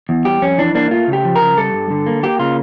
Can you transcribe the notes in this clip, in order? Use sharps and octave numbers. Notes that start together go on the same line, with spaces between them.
E2
G3 G4
F2 C#4
E3 D4
A#3 D4
A3 F4
C#3
G4
F3
A#4
C#3
G3 A4
G2
D3
A#3
A#3 G4
C#3 F4